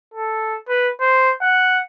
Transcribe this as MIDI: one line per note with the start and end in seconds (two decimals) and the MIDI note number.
0.14 0.58 69
0.68 0.91 71
1.01 1.33 72
1.42 1.80 78